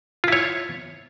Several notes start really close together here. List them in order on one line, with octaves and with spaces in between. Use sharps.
F4 E4 C#5